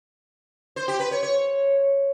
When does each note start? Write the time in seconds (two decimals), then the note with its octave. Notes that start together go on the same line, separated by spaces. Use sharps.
0.76 C5
0.88 G4
1.00 B4
1.11 C#5
1.23 C#5